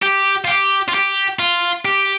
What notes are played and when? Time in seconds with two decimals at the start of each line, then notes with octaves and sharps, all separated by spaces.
0.02 G4
0.45 F4
0.47 G4
0.88 F4
0.94 G4
1.39 F4
1.85 G4